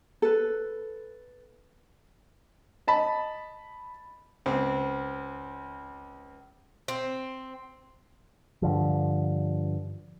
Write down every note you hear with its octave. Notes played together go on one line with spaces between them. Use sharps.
A4 B4
D#5 A5 B5
C#2 C4
C4
G2 D3 F3